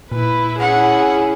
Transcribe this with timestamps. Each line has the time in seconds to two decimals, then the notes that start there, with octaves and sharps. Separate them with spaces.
0.12 A#2 E4 B4
0.59 C#4 E4 G#4 F#5